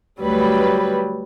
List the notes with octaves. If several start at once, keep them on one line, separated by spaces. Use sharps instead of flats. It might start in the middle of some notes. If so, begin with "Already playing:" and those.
D2 F#3 G3 B4